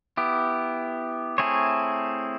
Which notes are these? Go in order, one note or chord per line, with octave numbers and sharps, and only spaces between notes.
B3 E4 G4
A3 C4 E4 G#4 C#5